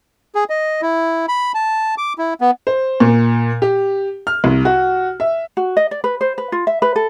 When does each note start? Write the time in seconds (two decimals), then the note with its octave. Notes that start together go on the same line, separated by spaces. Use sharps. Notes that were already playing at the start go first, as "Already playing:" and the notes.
0.35 G#4
0.50 D#5
0.82 E4
1.29 B5
1.54 A5
1.98 D6
2.18 E4
2.41 B3
2.67 C5
3.00 A#2
3.62 G4
4.27 F6
4.44 C2
4.65 F#4
5.20 E5
5.57 F#4
5.77 D#5
5.91 D5
6.04 B4
6.21 C5
6.38 B4
6.52 F4
6.67 E5
6.82 B4
6.96 A4